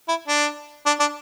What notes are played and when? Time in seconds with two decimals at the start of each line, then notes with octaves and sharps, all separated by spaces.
0.08 E4
0.28 D4
0.86 D4
1.00 D4